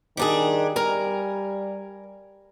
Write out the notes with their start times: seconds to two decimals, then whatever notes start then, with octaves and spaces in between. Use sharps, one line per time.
0.17 D#3 G3 D4 G#4
0.76 G3 A#4 G#5